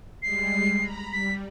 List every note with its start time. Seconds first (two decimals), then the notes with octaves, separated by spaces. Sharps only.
0.22 G3 G#3 C7
0.79 A#5 B5
1.13 G3 B6